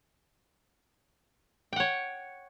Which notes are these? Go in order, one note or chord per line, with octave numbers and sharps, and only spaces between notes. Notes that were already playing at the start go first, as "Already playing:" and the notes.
C#5 F#5 G5